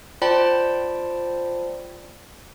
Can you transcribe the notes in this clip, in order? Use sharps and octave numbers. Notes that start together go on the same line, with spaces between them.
F4 C5 D5 G5 A5 B5